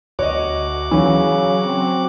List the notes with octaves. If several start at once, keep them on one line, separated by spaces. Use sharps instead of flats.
D2 F#4 C#5 D#5 D6
C#3 E3 F#3 C#4
C4